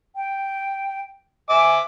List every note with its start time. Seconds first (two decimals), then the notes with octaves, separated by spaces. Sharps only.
0.16 G5
1.49 E5 G#5 D6